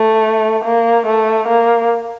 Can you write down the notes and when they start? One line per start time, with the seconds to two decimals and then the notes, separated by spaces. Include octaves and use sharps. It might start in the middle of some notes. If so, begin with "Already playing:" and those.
Already playing: A3
0.64 A#3
1.06 A3
1.48 A#3